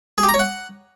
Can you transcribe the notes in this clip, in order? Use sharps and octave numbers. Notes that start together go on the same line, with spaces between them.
G#4
G4
A#5
C#5
F#5